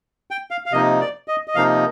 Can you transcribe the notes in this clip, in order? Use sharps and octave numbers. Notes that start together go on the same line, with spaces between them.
G5
F5
F5
C3 F3 A#3 D#4 D#5
D5
D#5
D#5
C3 F3 A#3 D#4 F5